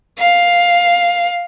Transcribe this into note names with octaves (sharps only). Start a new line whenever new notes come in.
F5